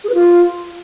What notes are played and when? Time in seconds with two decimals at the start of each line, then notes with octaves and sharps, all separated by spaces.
0.04 G#4
0.09 B4
0.14 F4